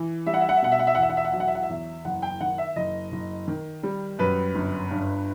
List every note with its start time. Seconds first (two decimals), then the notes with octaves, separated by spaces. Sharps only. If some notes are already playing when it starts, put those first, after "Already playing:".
Already playing: E3
0.26 G3 E5
0.34 F#5
0.41 E5
0.49 F#5
0.56 E5
0.62 B2 F#5
0.72 E5
0.79 F#5
0.87 E5
0.95 F#5
0.98 E2 E5
1.09 F#5
1.17 E5
1.25 F#5
1.32 F#3 E5
1.40 F#5
1.48 E5
1.55 F#5
1.63 E5
1.69 E2
2.05 F#1 F#5
2.22 G5
2.41 D#3 F#5
2.58 E5
2.76 F#1 D#5
3.12 F#1
3.48 D#3
3.83 G3
4.19 F#2 B4
4.55 G1
4.90 G2